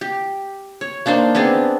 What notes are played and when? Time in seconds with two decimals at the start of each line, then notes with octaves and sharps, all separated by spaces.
0.01 G4
0.81 C#5
1.06 A#3 D4 D#4 C5
1.35 B3 C4 D4 G#4